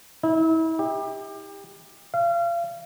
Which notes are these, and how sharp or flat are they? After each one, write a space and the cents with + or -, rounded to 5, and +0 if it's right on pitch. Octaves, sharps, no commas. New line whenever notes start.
E4 -35
G4 +25
F5 -35